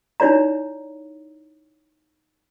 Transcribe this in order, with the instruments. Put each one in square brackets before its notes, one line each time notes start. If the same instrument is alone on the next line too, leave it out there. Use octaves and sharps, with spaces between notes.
[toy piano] D#4 E4 C#5 D5 A#5